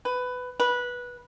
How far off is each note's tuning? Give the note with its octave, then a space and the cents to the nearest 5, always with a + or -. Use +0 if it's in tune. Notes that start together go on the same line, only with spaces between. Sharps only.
B4 +15
B4 -15